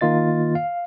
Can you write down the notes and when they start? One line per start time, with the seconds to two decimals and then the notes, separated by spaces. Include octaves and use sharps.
0.01 D#3 A#3 F4 D#5 A6
0.55 F5